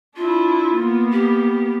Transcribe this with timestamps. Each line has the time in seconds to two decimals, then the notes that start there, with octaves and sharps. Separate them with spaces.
0.16 D4 E4 F4
0.75 A#3 B3
1.12 G4